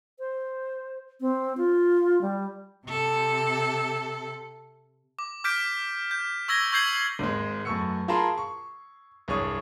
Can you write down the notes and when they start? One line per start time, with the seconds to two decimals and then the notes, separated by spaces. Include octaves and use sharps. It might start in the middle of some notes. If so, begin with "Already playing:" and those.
0.19 C5
1.21 C4
1.57 F4
2.22 G3
2.87 C3 A4
5.19 D6
5.44 D6 F6 G6 B6 D7
6.11 G6
6.48 C#6 E6 G#6 A#6 G7
6.72 C#6 E6 G6 G#6 C7 F#7
7.19 G#1 G#2 G#3
7.65 F#2 A3 B3 C#6 E6 C#7
8.08 F4 G#4 A#4 A5 B5 C6
8.38 C#6
9.28 C2 G2 G#4 C#5 C#6 D#6